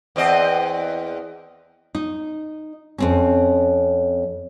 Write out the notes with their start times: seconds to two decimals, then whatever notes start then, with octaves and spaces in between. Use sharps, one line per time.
0.16 E2 C4 D#5
1.95 D#4
2.98 F2 C4 C#4